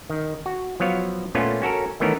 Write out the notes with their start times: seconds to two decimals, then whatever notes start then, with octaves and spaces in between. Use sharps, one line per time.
0.10 D#3
0.46 F#4
0.80 F3 F#3 B3 C#5 F5
1.35 A#2 A3 B3 C#4 F4
1.62 C#4 F#4 A4 A#4
2.00 D#3 E3 A3 B3 C#4 A#4